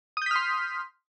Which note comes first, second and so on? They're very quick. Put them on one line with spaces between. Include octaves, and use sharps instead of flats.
D#6 G6 B6 F6 C6